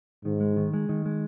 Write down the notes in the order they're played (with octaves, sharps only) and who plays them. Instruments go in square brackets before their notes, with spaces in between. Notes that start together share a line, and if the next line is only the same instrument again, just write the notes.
[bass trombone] G#2 [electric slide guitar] D#3
[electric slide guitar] G#3
D#3
G#3
D#3
G#3